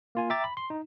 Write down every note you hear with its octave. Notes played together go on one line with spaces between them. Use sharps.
A#3 F4 G#5
E5 G5 A#5 D6 A6
B5
C6
D#4